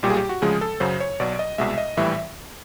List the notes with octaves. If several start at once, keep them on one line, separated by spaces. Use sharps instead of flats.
B1 A#2 G3 G4
G#4
G4
F#4
D2 C#3 F3 G#3 G#4
A4
F#2 C#3 F#3 C5
C#5
B1 B2 F#3 D5
D#5
C2 B2 G#3 E5
D#5
A#1 A2 E3 G3 E5